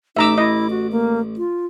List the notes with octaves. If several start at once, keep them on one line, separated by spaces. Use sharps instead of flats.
A1 D#4 E5 A#5 D6 E6
E4 D#5
F#4
A#3
F4